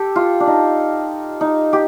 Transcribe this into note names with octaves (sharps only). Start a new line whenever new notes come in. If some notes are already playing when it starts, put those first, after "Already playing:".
Already playing: G4 A4
F4
D4
D#4
D#4
G4